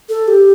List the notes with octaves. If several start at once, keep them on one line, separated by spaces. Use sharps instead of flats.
A4
G4